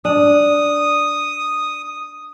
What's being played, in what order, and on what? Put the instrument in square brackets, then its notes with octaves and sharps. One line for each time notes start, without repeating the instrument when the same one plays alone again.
[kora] D4 [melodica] D#6